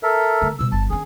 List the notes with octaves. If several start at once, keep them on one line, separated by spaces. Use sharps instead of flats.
A4 A#4 E5
D3 A3
B2 G3 E6
G1 A5
D#3 C#4 G#4